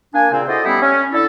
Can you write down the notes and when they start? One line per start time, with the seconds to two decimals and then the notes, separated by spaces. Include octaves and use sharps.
0.14 A#3 D4 G#5
0.32 A#2 C#3 C4
0.48 E4 F#4 A4 C5 D5 D#5
0.64 G3 A3 B3 C#4 D#4 E4
0.81 C#4
1.12 D3 E4 A4